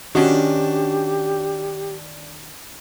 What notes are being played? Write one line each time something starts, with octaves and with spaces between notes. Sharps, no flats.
D#3 C#4 D4 F#4 G4